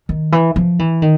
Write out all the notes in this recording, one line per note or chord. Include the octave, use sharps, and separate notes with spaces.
D#3
E3
F3
E3
D#3